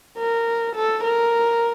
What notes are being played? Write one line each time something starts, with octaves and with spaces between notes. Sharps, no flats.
A#4
A4
A#4